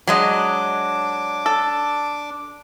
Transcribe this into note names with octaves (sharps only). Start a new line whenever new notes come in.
F#3 G#3 D4 D#5 D6
A4